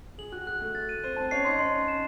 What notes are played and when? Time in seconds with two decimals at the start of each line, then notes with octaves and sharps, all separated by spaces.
0.18 G#4 F#7
0.32 F#4 F#6
0.47 G#4 F#6
0.60 A3 A4 F#6
0.75 A6
0.89 D#7
1.04 C4 C5 D#7
1.17 C4 C5 A5
1.31 C#4 C#5 C7
1.45 D#4 D#5 C6
1.59 C#4 C#5 C6
1.74 C6
1.88 E7